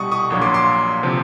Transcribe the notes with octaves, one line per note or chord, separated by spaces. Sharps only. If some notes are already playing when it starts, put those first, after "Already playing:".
Already playing: C2 B2 G3 C#6 D#6
C#6 D#6
A#1 A#2 F#3
C6 D6
C6 D6
C3 F3